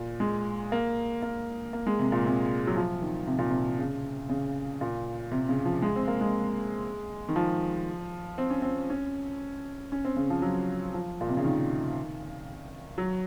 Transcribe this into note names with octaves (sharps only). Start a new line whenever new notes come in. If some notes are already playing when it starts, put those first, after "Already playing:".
Already playing: A#2
G#3
A#3
A#3
A#3
G#3
C3
A#2
C3
F#3
F3
D#3
C3
A#2
C3
C#3
C#3
A#2
C3
C#3
F3
G#3
C4
A#3
G#3
D#3
F3
C4
C#4
C4
C#4
C#4
C4
C#3
F3
F#3
F3
A#2
C3
C#3
D#3
F#3